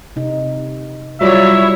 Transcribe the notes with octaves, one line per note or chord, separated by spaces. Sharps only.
C3 D#4
F#3 G3 E4 F4 C#5 D5 E5